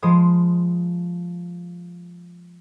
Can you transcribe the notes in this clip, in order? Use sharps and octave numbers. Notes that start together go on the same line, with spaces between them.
F3 G#3 B5 D#6